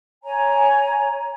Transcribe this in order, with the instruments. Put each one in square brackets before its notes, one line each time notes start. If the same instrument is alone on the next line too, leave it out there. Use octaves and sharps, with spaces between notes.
[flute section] C#5 G#5 A#5